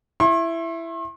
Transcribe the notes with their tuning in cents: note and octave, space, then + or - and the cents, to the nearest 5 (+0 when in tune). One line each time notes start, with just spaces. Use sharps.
E4 +10 C6 +45